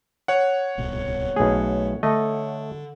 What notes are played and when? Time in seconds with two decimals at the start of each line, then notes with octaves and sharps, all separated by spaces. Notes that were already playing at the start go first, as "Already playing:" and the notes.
0.28 C#5 F#5
0.78 D1 C2 B2
1.36 B1 A3 G#4
2.03 D3 A3 D#5